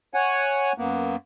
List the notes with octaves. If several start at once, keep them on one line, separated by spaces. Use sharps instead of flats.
C#5 F#5 G#5
F#2 A#3 B3